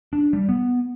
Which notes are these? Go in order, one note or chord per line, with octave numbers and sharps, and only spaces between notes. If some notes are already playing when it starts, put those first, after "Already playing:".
D4
G3
B3